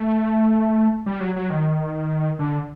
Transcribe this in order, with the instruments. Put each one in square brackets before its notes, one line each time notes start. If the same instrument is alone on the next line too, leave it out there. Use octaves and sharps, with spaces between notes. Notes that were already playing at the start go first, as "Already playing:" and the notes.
Already playing: [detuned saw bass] A3
G3
F#3
F#3
D#3
D3